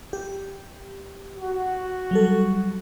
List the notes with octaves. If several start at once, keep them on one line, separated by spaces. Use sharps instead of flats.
G4
F#4
F#3 G3 A4